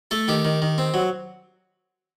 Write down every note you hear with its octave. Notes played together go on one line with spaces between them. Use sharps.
A3 A4
D#3 G4
D#3
D#3
C4
F#3